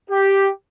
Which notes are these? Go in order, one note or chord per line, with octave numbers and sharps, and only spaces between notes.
G4